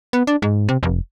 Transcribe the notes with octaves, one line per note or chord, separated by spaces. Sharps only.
B3
D4
G#2
C3
F1